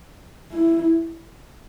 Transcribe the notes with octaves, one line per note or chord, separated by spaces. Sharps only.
E4